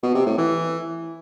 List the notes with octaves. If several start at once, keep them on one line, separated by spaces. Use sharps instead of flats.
B2
C3
A2
E3